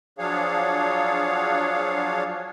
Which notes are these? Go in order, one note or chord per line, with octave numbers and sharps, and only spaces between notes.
F3 F#3 D4 G#4 C#5 F5